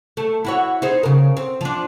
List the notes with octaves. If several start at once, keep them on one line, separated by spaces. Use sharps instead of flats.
A3
E4 F#4 C#5
D#4 G#4 C5
C#3 A#4
C4
F3 D4